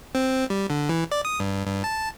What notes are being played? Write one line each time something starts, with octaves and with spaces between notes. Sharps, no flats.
C4
G3
D3
E3
D5
D#6
G2
G2
A5